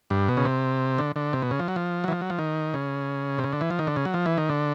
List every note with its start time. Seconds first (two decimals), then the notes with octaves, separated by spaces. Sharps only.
0.10 G2
0.29 B2
0.37 C#3
0.45 C3
0.98 D3
1.16 D3
1.33 C3
1.42 B2
1.51 C#3
1.59 F3
1.68 F#3
1.76 F3
2.04 E3 F#3
2.12 F3
2.21 F#3
2.30 F3
2.39 D#3
2.74 C#3
3.38 C3
3.44 C#3
3.53 D3
3.61 E3
3.70 F3
3.79 D#3
3.87 D3
3.96 C#3
4.05 F#3
4.14 F3
4.26 E3
4.38 D#3
4.49 D3